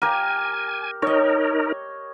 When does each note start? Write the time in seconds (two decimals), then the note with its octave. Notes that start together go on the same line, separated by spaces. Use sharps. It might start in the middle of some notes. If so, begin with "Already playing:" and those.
0.02 G4 A#4 G#5
1.02 D#4 A#4 C#5 D#5